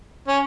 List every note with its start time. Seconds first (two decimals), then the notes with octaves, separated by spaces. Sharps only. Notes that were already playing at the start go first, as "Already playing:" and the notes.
0.28 C#4